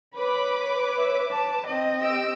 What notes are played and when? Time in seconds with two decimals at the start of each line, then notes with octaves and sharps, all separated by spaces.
0.15 B4 C#5 B5 D6
0.98 E5
1.31 A5
1.67 C4 D#5
2.01 G4 E6 D7